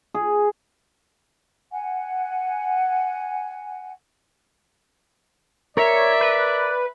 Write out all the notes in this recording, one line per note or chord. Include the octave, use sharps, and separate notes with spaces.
G#4
F#5 G#5
A#4 C#5 D5 E5
B4